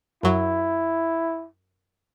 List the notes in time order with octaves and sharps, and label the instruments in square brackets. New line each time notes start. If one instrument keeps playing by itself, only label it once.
[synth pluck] F#2 F#3 [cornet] E4